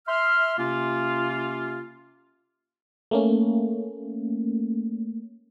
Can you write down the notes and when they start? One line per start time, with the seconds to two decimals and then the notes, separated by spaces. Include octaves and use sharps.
0.08 E5 C6 F6
0.58 C3 A#3 C#4 F4
3.11 A3 A#3 C#4